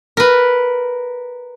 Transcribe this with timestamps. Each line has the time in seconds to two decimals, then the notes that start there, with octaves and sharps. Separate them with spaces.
0.17 A#4 B4